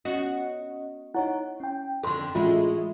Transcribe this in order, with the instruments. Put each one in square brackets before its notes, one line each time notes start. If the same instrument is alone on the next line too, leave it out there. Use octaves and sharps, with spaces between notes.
[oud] B3 F#4 [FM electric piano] C#4 D#5
[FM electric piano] D#4 C#5 F#5 [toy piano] E4
[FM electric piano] C#4 G5
[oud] F2 D3 [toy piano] A4 C6
[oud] A2 G#3 A3 [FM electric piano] E3 C#4 F#4 [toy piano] F4